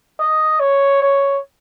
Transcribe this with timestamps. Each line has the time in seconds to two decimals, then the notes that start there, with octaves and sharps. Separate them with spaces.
0.19 D#5
0.60 C#5
1.02 C#5